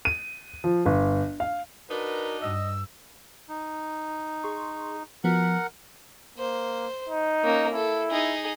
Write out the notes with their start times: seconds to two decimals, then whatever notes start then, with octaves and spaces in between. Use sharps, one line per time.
0.05 D#7
0.64 F3
0.86 G1
1.40 F5
1.90 D4 D#4 F#4 A#4 B4
2.41 G2 D#5 E6
3.49 D#4
4.44 G#4 C6 C#6
5.24 F3 B3 F#4 A#4 F#5
6.38 A#3 C5
7.09 D#4
7.44 A#3 C#4
7.73 E4 A4
8.11 D#4 G#4